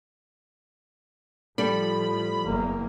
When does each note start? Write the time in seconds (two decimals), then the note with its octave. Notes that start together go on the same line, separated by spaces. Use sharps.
1.58 A2 F3 G3 A4 D5 B5
2.43 F#1 E2 A#3